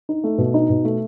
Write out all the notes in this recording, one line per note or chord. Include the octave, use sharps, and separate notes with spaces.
D#4
A3
B2
D#4
B2
A3